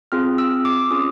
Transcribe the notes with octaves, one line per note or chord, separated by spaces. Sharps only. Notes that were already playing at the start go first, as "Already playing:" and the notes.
C4 F4 G#4 F6
E6
D6
C#4 F4 G#4 D#6